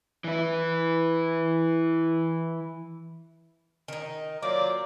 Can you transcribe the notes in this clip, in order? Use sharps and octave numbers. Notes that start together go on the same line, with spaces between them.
E3 E4
D#3 D#4
F#3 A#3 F4 C5 D5 D6